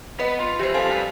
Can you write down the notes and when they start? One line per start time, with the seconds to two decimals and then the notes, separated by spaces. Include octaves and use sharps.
0.20 B3 B4 D#5
0.39 F4
0.59 E3 G4 C5
0.74 F3 C4 A4 F5 G#5
0.90 G3 B4